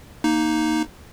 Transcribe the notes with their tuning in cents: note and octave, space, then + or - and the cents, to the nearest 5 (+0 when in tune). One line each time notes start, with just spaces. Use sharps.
A#3 +0 D#4 +0